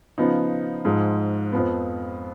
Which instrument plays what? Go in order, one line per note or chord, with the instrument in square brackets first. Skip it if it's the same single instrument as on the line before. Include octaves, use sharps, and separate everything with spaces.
[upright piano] C#3 F3 B3 D#4
G#2 F3 G#3
F2 F3 B3